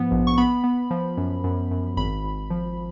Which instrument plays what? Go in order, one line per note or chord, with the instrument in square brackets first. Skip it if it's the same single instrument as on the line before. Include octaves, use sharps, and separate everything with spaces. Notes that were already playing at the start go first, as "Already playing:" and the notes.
Already playing: [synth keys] G#2 F3 B3
A#1
C#6
B3 B5
B3
F3
F#2
F#2
F#2
G#1 B5
G#1
F3